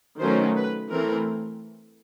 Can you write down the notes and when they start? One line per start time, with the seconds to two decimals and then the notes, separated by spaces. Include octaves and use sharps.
0.20 D#3 F#3 A3 C#4 C5
0.56 B4
0.90 E3 A3 C4 A#4